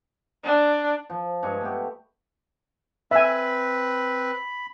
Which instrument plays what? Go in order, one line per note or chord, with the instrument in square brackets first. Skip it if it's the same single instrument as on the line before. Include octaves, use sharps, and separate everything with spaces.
[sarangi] D4
[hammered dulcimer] F3
G2 G#3 G#5 C#6
A3 B3 G4
[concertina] C4 B4 [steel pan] E5 G#5 [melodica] B5